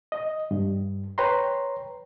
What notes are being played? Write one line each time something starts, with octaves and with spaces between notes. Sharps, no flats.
D#5
G2
B4 C#5 G5 A#5 C6